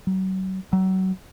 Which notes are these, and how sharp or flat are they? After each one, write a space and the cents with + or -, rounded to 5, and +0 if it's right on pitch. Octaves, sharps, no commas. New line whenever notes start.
F#3 +35
F#3 +30